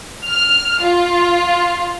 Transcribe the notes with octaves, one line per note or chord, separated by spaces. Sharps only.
F6
F4